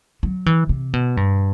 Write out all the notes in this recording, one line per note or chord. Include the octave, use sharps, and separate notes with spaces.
F#3
E3
C3
B2
G2